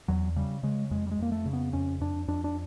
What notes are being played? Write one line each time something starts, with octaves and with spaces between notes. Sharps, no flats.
E2 F#3
C#3 G3
C#3 G#3
F2 G#3
G3
G#3
F2 A#3
A3
C#3
B3
F2 C#4
F2 D4
F2 D4
D4